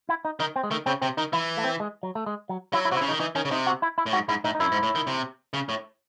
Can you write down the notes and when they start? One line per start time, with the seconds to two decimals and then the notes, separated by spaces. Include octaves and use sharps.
0.09 E4
0.25 D#4
0.40 D#3 D#4
0.56 C4
0.64 G#3
0.71 D#3 A3
0.86 C#3 C4
1.02 C3 C4
1.17 D#3 D#4
1.33 E3 E4
1.57 A3
1.64 C4
1.80 G#3
2.03 F#3
2.15 A3
2.26 G#3
2.49 F#3
2.73 F#3 E4
2.85 E4
2.92 C3 F#4
2.97 E4
3.01 C#3
3.08 D#3 D#4
3.20 E3 D#4
3.35 D#3 C#4
3.45 C#3
3.51 C3 D#4
3.67 F#4
3.82 E4
3.98 E4
4.06 A2
4.13 G#2 F#4
4.28 G#2 E4
4.44 A2 D#4
4.55 D#4
4.60 F#2 E4
4.72 G#2
4.83 A2
4.95 D#3
5.07 C3
5.53 C#3
5.69 A2